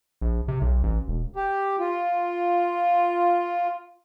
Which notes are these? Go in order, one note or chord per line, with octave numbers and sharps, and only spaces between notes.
A#1
C3
B1
A1
E1
G4
F4